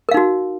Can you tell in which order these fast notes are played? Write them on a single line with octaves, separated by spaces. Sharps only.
A#4 F5 D#4 F#4